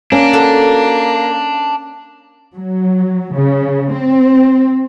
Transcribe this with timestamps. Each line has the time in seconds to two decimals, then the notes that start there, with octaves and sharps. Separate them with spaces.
0.12 A#3 C#4 D4
0.33 F#4 A4
2.56 F#3
3.35 C#3
3.92 C4